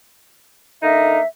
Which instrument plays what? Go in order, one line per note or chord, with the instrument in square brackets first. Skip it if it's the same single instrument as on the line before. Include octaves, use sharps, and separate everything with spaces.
[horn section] D3 A#3 D#4 [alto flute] E5